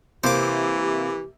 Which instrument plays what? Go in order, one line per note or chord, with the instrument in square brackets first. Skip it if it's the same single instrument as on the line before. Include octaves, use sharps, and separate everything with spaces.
[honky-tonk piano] C3 A#3 [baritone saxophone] E3 [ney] G4 [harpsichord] C5 D6